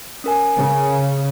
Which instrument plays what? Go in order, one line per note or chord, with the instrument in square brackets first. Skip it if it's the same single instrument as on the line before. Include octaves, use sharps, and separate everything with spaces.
[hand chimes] C#4 A#4 G#5
[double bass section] C#3